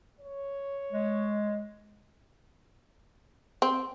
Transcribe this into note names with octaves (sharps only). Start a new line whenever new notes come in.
C#5
G#3
C4